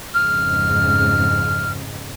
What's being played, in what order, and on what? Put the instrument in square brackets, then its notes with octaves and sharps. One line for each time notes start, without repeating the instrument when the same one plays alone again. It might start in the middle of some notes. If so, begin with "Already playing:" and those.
[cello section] F2 G#2 C#3 [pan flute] F6